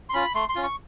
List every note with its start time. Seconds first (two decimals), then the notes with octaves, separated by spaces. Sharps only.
0.09 C6
0.14 C#4 F4 B5
0.34 A3 C6
0.49 C6
0.55 C#4 F4
0.63 C#6